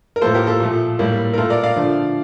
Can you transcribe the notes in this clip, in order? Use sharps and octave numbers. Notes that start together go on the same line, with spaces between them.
A#4
A2 F3 A#3 A4 C5
G4 A#4
F4 A4
A#2 F3 A3
A2 G3 A#3
A#4
A#2 A3 F4 A4
A#4 D5
D5 F5
D3 F3 A3